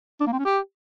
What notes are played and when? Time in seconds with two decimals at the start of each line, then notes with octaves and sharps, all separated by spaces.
0.20 D4
0.27 A#3
0.33 C4
0.39 C#4
0.45 G4